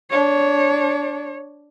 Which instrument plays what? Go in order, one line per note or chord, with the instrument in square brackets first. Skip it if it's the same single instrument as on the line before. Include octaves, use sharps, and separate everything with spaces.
[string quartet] D4 [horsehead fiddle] C#5